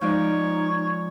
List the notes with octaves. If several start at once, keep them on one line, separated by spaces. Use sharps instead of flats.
F3 G#3 D#4 C#5 D5